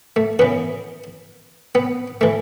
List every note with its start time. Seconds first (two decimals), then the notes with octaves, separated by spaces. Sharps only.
0.16 A3
0.39 F#2 E3 B3
1.75 B3
2.21 E3 A3